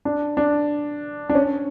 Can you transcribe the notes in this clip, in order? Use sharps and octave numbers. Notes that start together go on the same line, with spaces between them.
D4
D4
D4
C#4